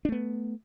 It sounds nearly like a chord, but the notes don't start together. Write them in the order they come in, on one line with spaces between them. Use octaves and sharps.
D4 A3 B3